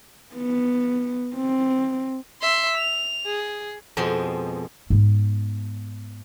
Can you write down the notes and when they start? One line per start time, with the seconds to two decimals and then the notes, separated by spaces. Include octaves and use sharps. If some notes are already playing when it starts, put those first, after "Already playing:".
0.35 B3
1.35 C4
2.42 E5 C6
2.78 F7
3.26 G#4
3.97 F2 B2 G#3 C5 C6
4.90 G#2 B3